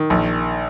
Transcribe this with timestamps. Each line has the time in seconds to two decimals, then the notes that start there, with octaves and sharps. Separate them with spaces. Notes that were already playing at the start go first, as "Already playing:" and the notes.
Already playing: D#3
0.10 A#1